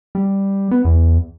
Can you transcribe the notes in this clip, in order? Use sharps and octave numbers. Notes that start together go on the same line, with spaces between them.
G3
B3
E2